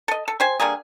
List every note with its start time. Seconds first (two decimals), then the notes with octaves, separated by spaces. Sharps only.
0.08 A4 D#5
0.28 A4
0.40 G4 C5 G#5
0.60 D3 G3 A#3 G#4